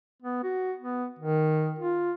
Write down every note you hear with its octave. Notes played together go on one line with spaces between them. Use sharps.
B3
F#4
B3
D#3
F4